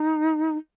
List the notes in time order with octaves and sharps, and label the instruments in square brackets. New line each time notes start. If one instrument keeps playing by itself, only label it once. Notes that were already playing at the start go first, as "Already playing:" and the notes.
Already playing: [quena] D#4